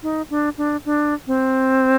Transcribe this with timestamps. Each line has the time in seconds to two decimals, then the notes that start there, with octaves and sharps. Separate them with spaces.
0.03 D#4
0.30 D4
0.58 D4
0.85 D4
1.27 C4